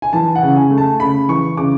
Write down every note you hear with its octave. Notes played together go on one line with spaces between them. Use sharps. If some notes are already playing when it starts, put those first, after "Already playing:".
G#5
E3 A5
F#5
C#3
G#5
A3
A5
C#3 B5
E3 C#6
C#3 D6